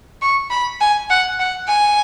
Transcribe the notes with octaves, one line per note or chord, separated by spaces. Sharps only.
C#6
B5
G#5
F#5
F#5
G#5